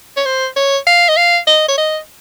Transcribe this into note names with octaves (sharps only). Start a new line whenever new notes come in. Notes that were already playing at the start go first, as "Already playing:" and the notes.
C#5
C5
C#5
F5
D#5
F5
D#5
C#5
D#5